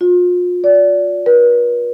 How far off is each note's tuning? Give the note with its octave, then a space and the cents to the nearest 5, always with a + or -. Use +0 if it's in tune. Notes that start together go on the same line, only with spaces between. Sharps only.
F4 +35
D5 -25
B4 -45